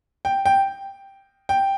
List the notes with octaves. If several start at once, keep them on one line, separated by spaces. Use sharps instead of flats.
G5
G5
G5